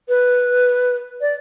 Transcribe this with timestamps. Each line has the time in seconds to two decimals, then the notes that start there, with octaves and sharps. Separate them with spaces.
0.09 B4
1.21 D5